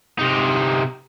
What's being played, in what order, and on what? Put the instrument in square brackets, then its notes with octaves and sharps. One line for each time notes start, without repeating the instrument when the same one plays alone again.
[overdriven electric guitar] C3 D#4